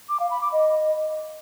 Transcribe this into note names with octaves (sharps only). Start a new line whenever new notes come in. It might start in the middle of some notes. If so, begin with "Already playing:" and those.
D6
F5
B5
D6
D#5